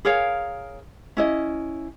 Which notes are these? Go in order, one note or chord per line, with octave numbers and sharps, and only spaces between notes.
G#4 A#4 C#5 F5
C#4 E4 D#5